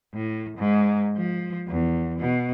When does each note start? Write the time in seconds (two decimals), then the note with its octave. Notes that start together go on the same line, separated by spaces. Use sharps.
0.14 A2
0.57 G#2
1.17 F3
1.68 E2
2.18 B2